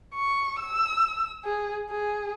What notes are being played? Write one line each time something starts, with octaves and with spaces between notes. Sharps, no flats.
C#6
E6
G#4
G#4